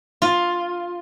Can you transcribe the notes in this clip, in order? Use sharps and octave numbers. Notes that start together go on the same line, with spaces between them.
F4